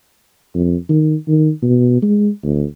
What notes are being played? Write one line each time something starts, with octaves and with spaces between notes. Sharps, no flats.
F2
D#3
D#3
B2
G#3
D2